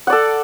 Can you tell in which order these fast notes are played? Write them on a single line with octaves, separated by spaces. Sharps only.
F#5 D5 A4